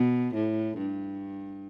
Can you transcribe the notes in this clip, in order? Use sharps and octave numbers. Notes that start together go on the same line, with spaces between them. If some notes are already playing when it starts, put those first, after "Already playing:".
Already playing: B2
A2
G2